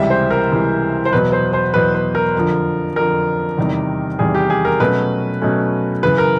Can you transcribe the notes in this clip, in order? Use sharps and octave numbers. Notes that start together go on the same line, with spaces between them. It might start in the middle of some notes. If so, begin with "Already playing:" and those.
Already playing: C#2 C3 E3 G3 E5
C5
A#4
C#2 C3 E3 G3
C5
E2 B2 F#3 B4
C5
C5
E2 B2 F#3 B4
B4
A#4
F2 D3 F3
F2 D3 F3 A#4
E2 C3 D#3 G3
E2 C3 D#3 G3 G#4
G4
G#4
A#4
B2 F#3 A3 C#4 B4
B2 F#3 A3 C#4
F#2 C#3 E3 B4
A#4